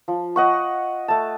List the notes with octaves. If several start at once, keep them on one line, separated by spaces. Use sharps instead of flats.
F3
D#5 F#5 C#6
A3 A5